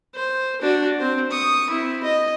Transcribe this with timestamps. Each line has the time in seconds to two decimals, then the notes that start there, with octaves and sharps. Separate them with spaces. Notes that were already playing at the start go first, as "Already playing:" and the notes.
0.14 C5
0.62 D4 F#4
1.00 C4 C5
1.31 C#6 D#6
1.70 C4 E4
2.04 D#5